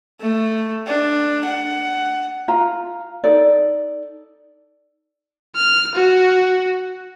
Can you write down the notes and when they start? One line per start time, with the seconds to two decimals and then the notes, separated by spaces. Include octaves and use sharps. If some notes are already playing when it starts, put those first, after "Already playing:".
0.21 A3
0.86 D4
1.45 F#5
2.48 F4 A#5
3.24 D#4 A4 D5
5.55 F6
5.94 F#4